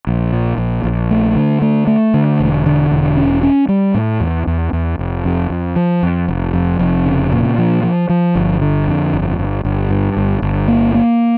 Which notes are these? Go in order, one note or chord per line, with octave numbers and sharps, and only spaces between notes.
A#1
A#2
A#1
A#1
A3
D3
A3
A3
D3
E1
D3
E1
C#4
C#4
G3
A2
E2
E2
E2
F1
F2
F2
F3
F2
F1
F2
F1
C#3
A#2
F3
F3
F3
G1
D3
F2
G1
G1
G1
G2
G1
G1
A#3
A#3